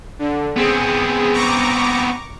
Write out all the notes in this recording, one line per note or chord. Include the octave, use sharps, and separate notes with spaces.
D3
B3 C4 G#4
A#5 C#6 D6